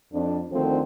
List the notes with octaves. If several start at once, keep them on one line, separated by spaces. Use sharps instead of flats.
F2 D4
D2 D3 D#3 F3 C4